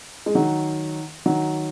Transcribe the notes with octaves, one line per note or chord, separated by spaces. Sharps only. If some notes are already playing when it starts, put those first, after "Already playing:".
G#3
D#3 F#3
D#3 F#3